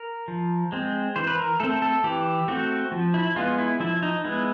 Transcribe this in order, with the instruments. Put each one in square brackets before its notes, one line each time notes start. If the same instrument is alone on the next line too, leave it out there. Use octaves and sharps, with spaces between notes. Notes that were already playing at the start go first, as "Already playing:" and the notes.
Already playing: [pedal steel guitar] A#4
F3
G#3 C4
E3 C5
B4
A#4
A3 C4 A4
A4
E3 G4
A3 C4 F#4
F3
E4
G#3 B3 F4
E4
F3 E4
D#4
G#3 B3 E4